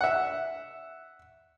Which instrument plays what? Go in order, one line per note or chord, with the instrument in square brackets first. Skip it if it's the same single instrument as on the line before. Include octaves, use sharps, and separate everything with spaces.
[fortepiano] E5 F#5